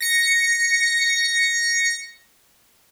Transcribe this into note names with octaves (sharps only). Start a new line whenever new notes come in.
A#6 C#7